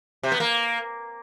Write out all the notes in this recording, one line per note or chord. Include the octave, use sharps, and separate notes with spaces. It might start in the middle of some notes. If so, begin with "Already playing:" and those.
C3
B3
A#3